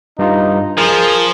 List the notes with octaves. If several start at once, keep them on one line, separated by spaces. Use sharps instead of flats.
G2 D#4 F4
F3 G#4 A#4